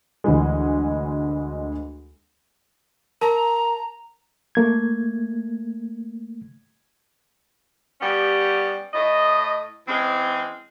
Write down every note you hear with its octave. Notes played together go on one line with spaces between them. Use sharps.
D2 E3 G#3
A#4 A5 A#5
A3 A#3 G#6
G3 B3 C#4 G4
A2 D#5
E3 G#3 C4 C#4